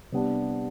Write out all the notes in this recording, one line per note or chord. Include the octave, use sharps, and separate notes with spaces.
C3 G3 B3 D4